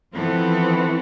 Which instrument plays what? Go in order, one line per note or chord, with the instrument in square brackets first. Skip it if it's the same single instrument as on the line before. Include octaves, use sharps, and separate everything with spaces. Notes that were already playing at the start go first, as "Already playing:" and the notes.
[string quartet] E3 F3 B3 C4 A4